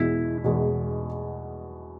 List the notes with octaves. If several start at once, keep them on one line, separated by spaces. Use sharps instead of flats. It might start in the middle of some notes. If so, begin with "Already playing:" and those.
Already playing: E2 B2 G#3 E4
E2 B2 G#3